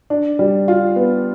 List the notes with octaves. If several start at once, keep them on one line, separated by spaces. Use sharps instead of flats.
D4
G3
F4
B3